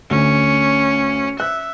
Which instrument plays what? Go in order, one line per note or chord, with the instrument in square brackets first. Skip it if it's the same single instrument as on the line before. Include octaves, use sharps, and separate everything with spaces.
[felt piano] D2 [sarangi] C#4
[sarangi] E5 [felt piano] F#6